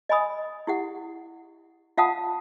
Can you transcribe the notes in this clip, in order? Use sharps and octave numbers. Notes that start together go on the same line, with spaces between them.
D#5 G#5 B5 D#6
E4 G4 F#5
F4 F5 F#5 A5 D#6